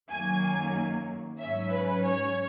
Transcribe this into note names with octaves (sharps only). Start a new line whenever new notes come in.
F#2 D#3 F#3 A#3 G#5
G#5
G#2 F#3 C#4 E5
B4
C#5